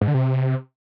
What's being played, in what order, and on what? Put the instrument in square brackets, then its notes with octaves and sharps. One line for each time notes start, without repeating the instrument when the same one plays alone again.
[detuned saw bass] G#2
D3
C3